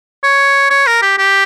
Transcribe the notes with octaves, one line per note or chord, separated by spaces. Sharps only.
C#5
C#5
A#4
G4
G4